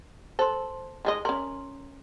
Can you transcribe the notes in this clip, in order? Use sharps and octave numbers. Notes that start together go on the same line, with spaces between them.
A4 C5 C6
D#3 G#3 D#5
C#4 A#4 C6